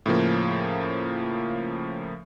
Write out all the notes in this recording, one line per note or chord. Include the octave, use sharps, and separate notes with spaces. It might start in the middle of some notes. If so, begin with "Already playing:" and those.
A2 C#3 F3 A#3